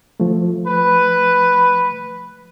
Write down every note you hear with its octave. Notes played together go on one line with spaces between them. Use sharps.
F3 A3
B4